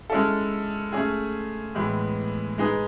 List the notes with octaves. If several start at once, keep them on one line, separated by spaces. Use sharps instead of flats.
G#3 C#4 E4 A4
A3 C#4 G#4
A2 E3 G#3 B3
G#3 D#4 G#4 B4